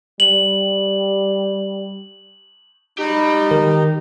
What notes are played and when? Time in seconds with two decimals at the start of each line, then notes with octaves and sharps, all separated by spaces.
0.20 G3 F#7
2.98 D#4 G4 B5
3.51 D#3 A#4